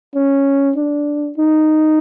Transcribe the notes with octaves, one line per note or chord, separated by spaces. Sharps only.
C#4
D4
D#4